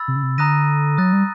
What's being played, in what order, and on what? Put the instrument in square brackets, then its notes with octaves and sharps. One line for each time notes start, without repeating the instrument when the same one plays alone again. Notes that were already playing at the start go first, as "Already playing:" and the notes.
Already playing: [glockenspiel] B5 E6 A6
[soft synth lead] C3
C#3
C3
[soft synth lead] D3 [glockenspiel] A#5 D#6 F#6 A#6 D#7
[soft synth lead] F#3 [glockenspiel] D#6 F#6 A6
[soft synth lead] G3